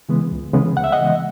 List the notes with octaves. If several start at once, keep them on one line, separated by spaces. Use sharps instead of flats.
C#3 E3 G#3 B3
C#2
C#3 E3 G#3 B3
C#2 F#5
E5
D#5 F#5
C#3 E3 G#3 B3